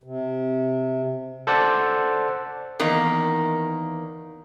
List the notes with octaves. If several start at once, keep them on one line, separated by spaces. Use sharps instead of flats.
C3
A4 C5 D5 F#5
E2 D#3 A#3